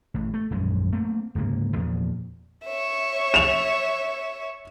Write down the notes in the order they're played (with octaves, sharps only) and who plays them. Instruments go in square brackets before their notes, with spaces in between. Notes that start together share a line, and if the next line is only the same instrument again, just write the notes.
[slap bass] A1 A2
A3
D#1 A#1 F#2 G#3
A3 A#3 C4
D1 G#2 C#3 A#3
E2 A#2 F3
[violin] C#5 E5
[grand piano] E7 F7